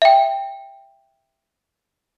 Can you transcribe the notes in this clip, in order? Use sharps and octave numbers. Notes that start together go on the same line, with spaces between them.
E5 G5